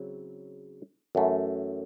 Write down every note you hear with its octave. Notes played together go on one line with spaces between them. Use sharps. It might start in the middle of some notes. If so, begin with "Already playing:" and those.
Already playing: C#3 F#3 C4 E4
F#2 E3 A3